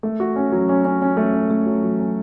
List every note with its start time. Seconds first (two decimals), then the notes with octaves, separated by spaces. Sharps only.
0.03 A3
0.20 F#4
0.36 C#4
0.52 F#3
0.69 C#4
0.85 C#4
1.02 C#4
1.17 A3
1.33 C#4
1.50 A3
1.66 F#3
1.83 F#3
2.00 C#4